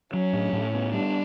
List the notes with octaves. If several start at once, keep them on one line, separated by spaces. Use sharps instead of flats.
F#3 C#4
A2
A2
B3
G3 D4